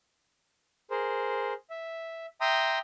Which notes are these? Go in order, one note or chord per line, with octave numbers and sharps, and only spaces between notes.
G#4 A#4 C5
E5
E5 G5 A#5 C6 D#6